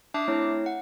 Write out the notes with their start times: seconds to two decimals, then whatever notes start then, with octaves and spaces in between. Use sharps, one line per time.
0.14 D4 E5 A5 D6 F#6 C7
0.28 A3 C4 E4 C#5
0.66 F#5